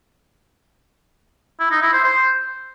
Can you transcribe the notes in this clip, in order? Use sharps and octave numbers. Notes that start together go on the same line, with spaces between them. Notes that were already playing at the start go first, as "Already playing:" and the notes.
E4
D#4
E4
C5
C5